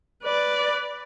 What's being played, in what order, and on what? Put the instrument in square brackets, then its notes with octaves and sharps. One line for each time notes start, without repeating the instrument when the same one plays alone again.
[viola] B4 D5